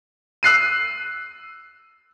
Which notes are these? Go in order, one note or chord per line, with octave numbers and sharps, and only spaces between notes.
E6 F#6 C7 D#7